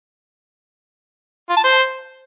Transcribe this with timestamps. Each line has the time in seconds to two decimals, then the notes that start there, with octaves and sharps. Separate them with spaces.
1.50 F4
1.57 A5
1.64 C5